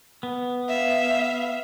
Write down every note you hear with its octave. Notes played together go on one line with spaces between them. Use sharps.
B3
E5 F5